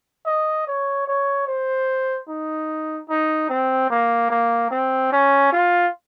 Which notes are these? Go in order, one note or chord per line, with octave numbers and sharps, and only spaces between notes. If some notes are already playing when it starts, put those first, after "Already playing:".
D#5
C#5
C#5
C5
D#4
D#4
C4
A#3
A#3
C4
C#4
F4